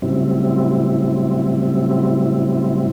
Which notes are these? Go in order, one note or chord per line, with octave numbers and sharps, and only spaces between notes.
A2 C#3 F#3 G3 C4 E4